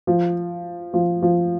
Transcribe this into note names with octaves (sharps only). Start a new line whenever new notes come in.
F3
F3
F3